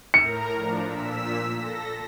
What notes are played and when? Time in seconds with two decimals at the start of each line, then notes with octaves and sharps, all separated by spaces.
0.14 A2 A#4 A#5 C#7
0.56 F3 D4
0.87 A#2 E6 B6
1.56 A4 A#6